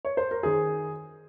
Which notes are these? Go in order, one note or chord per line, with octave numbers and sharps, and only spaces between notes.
C#5
C5
A#4
D#3 G#4